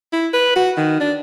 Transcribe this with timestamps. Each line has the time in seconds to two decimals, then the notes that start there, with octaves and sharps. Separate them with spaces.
0.13 E4
0.34 B4
0.56 F#4
0.77 D#3
1.00 D4